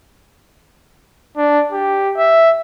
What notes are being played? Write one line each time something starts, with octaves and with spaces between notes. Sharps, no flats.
D4
G4
E5